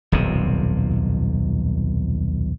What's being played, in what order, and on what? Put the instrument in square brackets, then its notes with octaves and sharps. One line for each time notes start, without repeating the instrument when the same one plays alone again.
[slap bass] D#1 B1 F2 C3